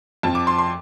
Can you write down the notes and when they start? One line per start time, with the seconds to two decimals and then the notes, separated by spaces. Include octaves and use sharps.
0.23 F2 F3 A5
0.35 D6
0.47 C6
0.58 C6